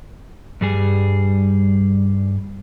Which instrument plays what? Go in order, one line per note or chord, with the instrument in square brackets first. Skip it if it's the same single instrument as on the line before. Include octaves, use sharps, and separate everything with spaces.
[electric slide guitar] G2 G3 G#4